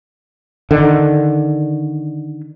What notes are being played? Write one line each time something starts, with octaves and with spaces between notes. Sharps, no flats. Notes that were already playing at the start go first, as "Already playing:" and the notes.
D3 D#3